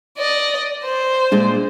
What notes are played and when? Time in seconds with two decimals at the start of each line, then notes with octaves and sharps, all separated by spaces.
0.18 D5 D#5
0.84 C5
1.31 A#2 G#3 D4